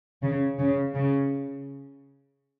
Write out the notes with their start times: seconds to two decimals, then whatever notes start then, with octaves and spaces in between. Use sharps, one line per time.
0.23 C#3
0.59 C#3
0.95 C#3